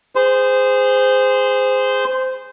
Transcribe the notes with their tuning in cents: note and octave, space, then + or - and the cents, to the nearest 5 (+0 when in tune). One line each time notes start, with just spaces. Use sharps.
G#4 -20 C5 -15